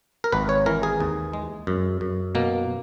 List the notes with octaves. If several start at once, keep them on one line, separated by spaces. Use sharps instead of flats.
A#4
G#1 B4
C#5
E3 A#4
G#4
D#2
G#3
F#2
F#2
B2 A#3